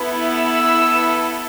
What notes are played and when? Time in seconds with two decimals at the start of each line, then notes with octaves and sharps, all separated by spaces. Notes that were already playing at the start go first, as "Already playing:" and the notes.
Already playing: B3 E4 A4
0.29 E6